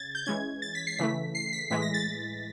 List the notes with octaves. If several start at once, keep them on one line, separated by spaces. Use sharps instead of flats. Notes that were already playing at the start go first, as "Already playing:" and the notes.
Already playing: C#3 G#6 A6
G6
E3 G#3 C#4 G#6
A6
B6
C7
C#3 E3 A3 B6
C7
B6
A2 E3 G#3 B6
A#6
A6